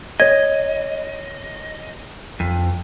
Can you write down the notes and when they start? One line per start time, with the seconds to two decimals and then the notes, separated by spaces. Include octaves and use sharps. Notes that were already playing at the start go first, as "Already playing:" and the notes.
0.20 C#5 D#5 G#6
2.40 F2